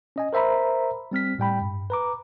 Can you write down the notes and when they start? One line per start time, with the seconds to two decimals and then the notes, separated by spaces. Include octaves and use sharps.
0.16 C#4 D#5 G#5
0.33 A#4 C5 E5 A#5 B5
1.11 G3 C4 F6 B6
1.38 A2 G3 G5 B5
1.61 G2
1.90 B4 A#5 D6